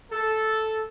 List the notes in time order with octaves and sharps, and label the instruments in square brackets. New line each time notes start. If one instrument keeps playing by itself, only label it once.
[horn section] A4